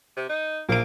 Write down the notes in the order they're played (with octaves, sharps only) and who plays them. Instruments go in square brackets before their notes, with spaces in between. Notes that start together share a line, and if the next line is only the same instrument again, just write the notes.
[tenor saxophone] C3
D#4
[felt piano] A#1 D7 [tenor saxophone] A#3